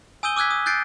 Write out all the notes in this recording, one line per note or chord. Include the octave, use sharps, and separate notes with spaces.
G#5 D#6 E6 G6 D#7 G7
D6 E6 F#6 G#6 B6
D#6
F#6 G6 A6 C7 D7